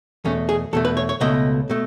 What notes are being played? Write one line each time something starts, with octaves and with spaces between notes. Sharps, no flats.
E2 B2 A3 C#4
G#4
E2 B2 A3 A4
B4
C#5
C#5
C#2 B2 A3 D#5
B2 A3